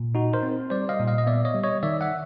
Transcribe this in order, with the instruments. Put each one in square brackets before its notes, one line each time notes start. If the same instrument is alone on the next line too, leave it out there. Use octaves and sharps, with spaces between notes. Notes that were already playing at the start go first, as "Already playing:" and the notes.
Already playing: [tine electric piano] A#2
D#4 F#4
A#4 C5
C4
G3 C5 D5
D#5 F5
A#2
D#5 F5
D#5
B3 D5 E5
C#5 D#5
G3
C#5 D#5
D#3 D5 E5
E5 F#5